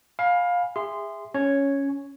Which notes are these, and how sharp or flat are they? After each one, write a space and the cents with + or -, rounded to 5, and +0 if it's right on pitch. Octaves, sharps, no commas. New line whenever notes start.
F5 +20 G#5 +0 B5 -15
G#4 -30 E5 +0 C6 -15
C#4 +5 C#5 +0